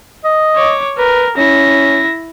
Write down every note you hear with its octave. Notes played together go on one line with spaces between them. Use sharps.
D#5
C#5 D6
A#4 B4
C#4 E4 A#6